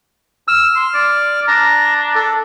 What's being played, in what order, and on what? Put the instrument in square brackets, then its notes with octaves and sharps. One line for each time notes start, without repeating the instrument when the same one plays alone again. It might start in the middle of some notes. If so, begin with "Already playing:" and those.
[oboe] E6 [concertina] F6
[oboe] C6
D5
[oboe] D4 [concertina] A#5
[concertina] A4